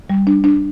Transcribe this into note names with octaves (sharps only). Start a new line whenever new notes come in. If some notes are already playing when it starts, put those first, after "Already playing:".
G3
D4
D4